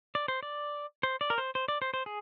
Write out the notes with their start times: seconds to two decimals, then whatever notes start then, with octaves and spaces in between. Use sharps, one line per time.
0.15 D5
0.28 C5
0.43 D5
1.03 C5
1.21 D5
1.30 A#4
1.38 C5
1.55 C5
1.68 D5
1.82 C5
1.94 C5
2.06 G#4